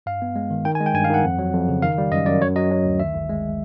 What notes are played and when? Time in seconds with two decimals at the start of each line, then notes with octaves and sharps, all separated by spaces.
0.06 G2 F5
0.22 B3
0.36 G#3
0.50 D#3
0.65 D#3 G5
0.75 G#5
0.81 G#3
0.86 G5
0.94 G2 G#5
1.04 F5
1.10 D#3 F#5
1.24 F2
1.39 F#3
1.54 F2
1.69 C#3
1.82 D#3 F5
1.98 G3
2.12 F#2 D#5
2.26 F#2 D5
2.42 F#3 C#5
2.56 F#3 D#5
2.71 F#3
2.85 D2
3.00 D#3 E5
3.14 G1
3.29 G#3